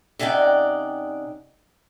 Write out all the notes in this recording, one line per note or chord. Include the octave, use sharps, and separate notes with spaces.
C3 C#4 D#4 D5 F#5 G5